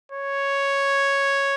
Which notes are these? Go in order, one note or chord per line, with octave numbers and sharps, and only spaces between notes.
C#5